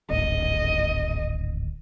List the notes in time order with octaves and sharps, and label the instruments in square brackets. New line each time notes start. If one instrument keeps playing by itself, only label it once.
[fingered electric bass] D1 G#1 [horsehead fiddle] D#5